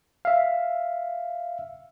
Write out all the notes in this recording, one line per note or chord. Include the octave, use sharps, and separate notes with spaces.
E5 F5